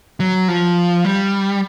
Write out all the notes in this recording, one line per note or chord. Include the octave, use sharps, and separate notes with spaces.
F#3
F3
G3